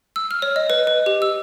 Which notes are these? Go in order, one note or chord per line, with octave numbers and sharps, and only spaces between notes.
E6
F6
C#5
D#5
B4
B4
G4
E6